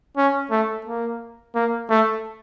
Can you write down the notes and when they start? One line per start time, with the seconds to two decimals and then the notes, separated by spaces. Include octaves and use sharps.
0.17 C#4
0.51 A3
0.86 A#3
1.55 A#3
1.90 A3